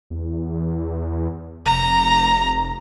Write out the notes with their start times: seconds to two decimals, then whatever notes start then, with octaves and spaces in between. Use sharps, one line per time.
0.10 E2
1.66 F1 A#5